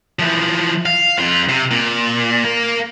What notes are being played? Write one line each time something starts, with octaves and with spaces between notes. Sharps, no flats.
E3 F3
F5
F2 F4
C3
A#2
A#3 A#4